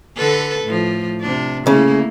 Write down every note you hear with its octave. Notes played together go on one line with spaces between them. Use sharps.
D3 A4 B4
A2 F3
C3 D4
C#3 A3 A#3 E4